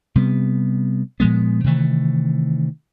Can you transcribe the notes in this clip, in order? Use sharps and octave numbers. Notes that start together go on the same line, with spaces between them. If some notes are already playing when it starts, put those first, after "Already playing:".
C3 G3 B3
A#2 F3 G#3 B3
C3 D#3 E3 A3